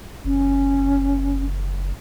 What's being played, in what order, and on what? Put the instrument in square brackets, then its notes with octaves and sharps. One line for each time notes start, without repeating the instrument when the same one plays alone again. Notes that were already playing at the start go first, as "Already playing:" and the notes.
[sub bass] F#1 [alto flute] C#4